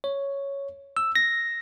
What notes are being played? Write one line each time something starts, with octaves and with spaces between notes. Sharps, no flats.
C#5
E6
A#6